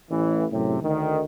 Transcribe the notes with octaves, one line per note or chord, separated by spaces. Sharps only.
A1 E3
F#2 A2 C3
D2 D#3